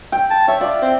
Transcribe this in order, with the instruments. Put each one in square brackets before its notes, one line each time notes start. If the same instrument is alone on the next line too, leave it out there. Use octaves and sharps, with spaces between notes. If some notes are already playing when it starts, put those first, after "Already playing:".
[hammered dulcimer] G5
[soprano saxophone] A5
[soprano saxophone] C#5 [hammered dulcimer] E5
[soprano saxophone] F4 [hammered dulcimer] D5
[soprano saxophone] C4